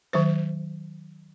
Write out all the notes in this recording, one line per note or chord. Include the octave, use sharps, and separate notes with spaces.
D#3 F#3 C5